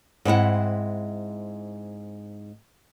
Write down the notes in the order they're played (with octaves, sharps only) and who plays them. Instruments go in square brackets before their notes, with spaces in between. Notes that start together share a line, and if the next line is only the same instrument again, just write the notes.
[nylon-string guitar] G#2 C4 E4 F#5